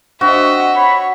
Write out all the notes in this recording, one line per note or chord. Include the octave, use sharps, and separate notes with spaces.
C4 D4 F#4 D#5 E5
C#5 B5